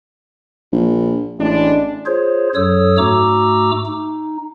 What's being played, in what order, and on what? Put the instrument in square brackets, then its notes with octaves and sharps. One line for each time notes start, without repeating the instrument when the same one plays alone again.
[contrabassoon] A#1
[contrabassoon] A1 [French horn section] A2 G#3 D4
[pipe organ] F4 G#4 C5 C#5
F#2 F#3 A4 C#5 D#6 E6
G#2 A3 F#4 A#5 D6 E6
D#4